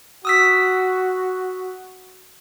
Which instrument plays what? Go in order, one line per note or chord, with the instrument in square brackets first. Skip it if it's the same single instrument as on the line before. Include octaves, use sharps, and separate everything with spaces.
[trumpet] F#4 [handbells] D#6 E6 B6